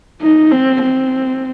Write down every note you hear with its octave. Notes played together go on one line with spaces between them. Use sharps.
D#4
C4
C4